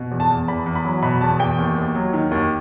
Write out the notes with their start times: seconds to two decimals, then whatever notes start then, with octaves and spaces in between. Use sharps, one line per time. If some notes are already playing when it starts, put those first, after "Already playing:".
Already playing: B2
0.11 E2
0.20 A5
0.30 E2
0.48 E2 B5
0.66 E2
0.75 B5
0.85 F#3
1.02 B2 B5
1.21 E2 A5
1.39 E2 G5
1.59 D#2
1.77 D#2
1.95 F#3
2.13 D#3
2.31 D#2